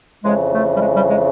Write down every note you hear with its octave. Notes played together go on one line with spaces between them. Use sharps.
F2 C#3 E3 G#3
A3
G3
G#3
G3
G#3